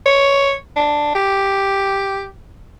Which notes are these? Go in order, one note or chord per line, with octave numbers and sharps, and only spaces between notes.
C#5
D4
G4